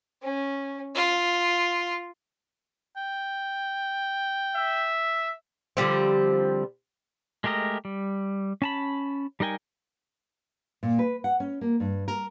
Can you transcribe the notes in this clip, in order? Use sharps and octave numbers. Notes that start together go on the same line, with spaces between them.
C#4
F4
G5
E5
D3 F3 G3 C4
G#3 A3 G4 A#4 D#5
G3
C#4 A5 B5
G3 D#4 A#4 G5 G#5
A#2
B4
F#5
C#4
A#3
G2
A#4